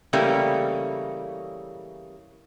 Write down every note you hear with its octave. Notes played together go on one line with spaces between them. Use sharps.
C#3 E3 G3 A3 A#3 C#4